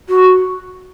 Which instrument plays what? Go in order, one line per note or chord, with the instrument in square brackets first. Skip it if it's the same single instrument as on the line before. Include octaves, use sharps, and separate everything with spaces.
[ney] F#4